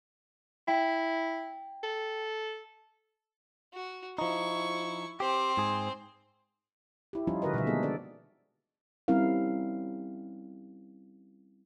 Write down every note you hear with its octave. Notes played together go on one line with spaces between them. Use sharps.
E4 G5
A4
F#4
F3 D#4 E4 C#6
C4 G4 C5
G#2 G#4
E4 G4
F3 G3 C#4 D#4 F4
D3 F#4 A#4 B4 D#5
B2 D#3 F3 G3 B4 E5
G#3 A#3 B3 D#4 G#4 A4
D4 A4 D5
G3 C4 C#4 E4 A#4 F5